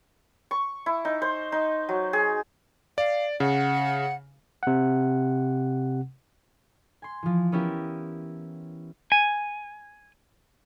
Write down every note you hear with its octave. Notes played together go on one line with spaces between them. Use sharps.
C#6
E4
D#4
C5
D#4
F#3
G#4
D5 F5
C#3 F#5
C3 F#5
G#5 C6
E3 F3
B3 C#4 E4 G4 A#4
G#5